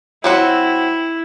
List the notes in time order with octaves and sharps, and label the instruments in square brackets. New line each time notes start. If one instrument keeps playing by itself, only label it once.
[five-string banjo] F#3 C4 F#4 [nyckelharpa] E4